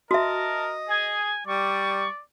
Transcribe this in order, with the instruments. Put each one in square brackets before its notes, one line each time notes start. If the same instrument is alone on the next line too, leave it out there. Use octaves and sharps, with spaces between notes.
[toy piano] F#4 E5 [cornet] A#4 [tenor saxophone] D#5 [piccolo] A5
[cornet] G#4 [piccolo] G#5
[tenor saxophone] G3 [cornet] D5 [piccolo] C#6